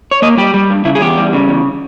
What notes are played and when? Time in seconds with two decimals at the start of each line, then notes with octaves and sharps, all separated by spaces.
0.11 C#5
0.22 A#3 D#5
0.37 G3 G4
0.54 G3
0.70 G2
0.85 C#3 E4
0.95 G#4
1.01 E2 G4
1.18 G3
1.33 C#3
1.48 E2